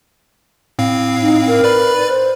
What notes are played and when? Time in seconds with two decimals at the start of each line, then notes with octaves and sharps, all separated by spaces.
0.79 A2 C4 F5
1.22 D#4
1.47 A#4
1.64 B4 D5 B5
2.09 C5